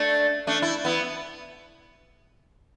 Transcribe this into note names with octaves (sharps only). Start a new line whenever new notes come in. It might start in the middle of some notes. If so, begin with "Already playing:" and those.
Already playing: A3 D4
A3 D4
E4
B3 E4